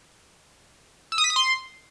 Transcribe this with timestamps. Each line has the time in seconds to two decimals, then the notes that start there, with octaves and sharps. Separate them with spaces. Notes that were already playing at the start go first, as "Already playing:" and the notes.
1.12 E6
1.18 D#6
1.24 B6
1.30 D#6
1.36 C6